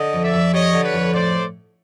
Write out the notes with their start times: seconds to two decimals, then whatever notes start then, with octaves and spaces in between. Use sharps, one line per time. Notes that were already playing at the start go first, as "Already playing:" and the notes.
Already playing: D3 D#5
0.13 F2
0.24 D5 E5
0.34 F2
0.54 G3 C#5 D#5
0.73 D3
0.83 B4 C#5
0.93 F2
1.13 A2 C5 D5